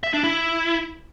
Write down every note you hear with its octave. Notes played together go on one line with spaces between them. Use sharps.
E5
D4
E4